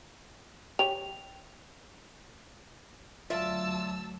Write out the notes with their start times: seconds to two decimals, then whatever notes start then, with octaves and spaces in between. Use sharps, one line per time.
0.79 G4 C#5 F7
3.30 D2 F#3 F4 D5 E5 A5 E6